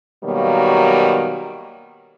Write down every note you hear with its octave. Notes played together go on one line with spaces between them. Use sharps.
B2 D#3 F#3 G3 A#3